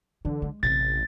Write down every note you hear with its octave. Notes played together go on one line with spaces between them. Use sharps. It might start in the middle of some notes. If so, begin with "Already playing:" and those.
D3 E3
G#3
A1 C3 A6